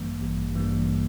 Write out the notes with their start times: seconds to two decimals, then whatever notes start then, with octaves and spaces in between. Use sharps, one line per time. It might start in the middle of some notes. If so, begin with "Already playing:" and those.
Already playing: A1 G2 E3 G3 A#3
0.22 A1
0.55 G2 E3 G3 A#3